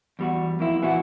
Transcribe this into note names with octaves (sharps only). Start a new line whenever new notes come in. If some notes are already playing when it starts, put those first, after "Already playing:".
E2 G3 F#4
F2 A#3 E4
A#2 E3 E4 F#4